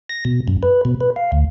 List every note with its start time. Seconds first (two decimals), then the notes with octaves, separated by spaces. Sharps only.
0.09 A#6
0.25 B2
0.48 F#2
0.63 B4
0.85 B2
1.01 B4
1.16 F5
1.32 D2